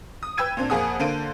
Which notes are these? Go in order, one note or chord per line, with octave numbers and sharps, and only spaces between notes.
D#6
B4 G5 E6 G#6 D#7
A#2 C4 D4
F2 A#3 G#4 F#5 D#6
D3 A#3 A4 C5 D7 D#7